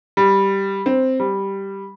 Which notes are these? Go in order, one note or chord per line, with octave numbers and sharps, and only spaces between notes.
G3
C4
G3